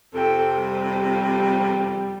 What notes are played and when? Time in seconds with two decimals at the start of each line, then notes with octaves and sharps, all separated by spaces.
0.14 F2 C3 A4 G5
0.61 G3